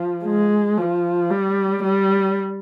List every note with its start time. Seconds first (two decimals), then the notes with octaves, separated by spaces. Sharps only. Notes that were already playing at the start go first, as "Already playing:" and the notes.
Already playing: F3
0.25 G#3
0.78 F3
1.30 G3
1.83 G3